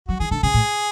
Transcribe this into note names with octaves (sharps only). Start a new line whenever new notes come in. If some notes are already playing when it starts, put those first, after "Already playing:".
F#3 F#4
E3 G#4
D3 A4
C#3 G#4
A2